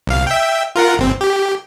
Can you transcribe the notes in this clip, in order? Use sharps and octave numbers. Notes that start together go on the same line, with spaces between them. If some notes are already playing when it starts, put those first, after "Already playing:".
C2 F5
E5 G5
F4 A#4 F#5
G1 C4
G4